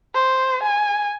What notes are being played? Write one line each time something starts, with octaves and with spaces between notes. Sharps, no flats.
C5
G#5